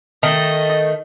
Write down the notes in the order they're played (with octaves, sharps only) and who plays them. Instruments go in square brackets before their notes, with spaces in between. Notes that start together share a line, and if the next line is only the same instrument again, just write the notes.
[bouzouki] D#3 A3 [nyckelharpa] D#5